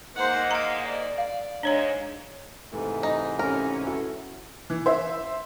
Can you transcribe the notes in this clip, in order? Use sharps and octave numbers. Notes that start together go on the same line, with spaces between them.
G#2 A#3 C5 D#5 F#5
F5 F#5 A#5
D5
F5
G#2 G#3 D4 C#5 A#5
G#2 C3 E3 A3
D#4
A3 C#4 G4 A#4
E4 F#4 A4
E3
C5 E5